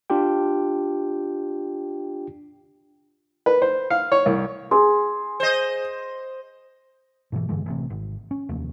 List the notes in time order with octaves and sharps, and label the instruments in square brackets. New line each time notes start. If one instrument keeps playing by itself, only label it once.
[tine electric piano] D4 F4 G4 G5
[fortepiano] B4
C5
F5
C#5
C2
[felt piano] G#4 [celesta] C6
[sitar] C5 D#5
[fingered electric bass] G#2 B2 E3
G2 D3 E3 G#3
A1 C3
G#1
C#4
F1 D#2 A#3